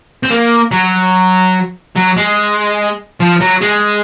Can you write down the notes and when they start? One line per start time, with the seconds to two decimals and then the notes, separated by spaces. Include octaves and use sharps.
0.23 C4
0.31 A#3
0.72 F#3
1.96 F#3
2.17 G#3
3.20 F3
3.40 F#3
3.61 G#3